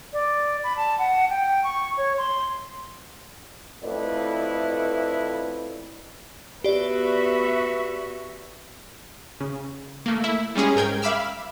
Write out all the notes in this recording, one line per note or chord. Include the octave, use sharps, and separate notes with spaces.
D5
B5
A5
F#5
G5
C#6
C#5
C6
F2 A3 E4 B4 D5 D#5
B3 F#4 G4 B4 D5 E5
C#3
A3 A#3
E4 E5
G3 G#3 C#4 G#4
G#2 A#4 G5 G#6
E5 F5 B5 D6 E6 F6